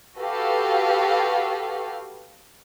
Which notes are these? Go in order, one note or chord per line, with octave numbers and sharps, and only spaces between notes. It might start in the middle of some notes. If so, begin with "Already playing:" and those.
F#4 G4 A4 B4 F5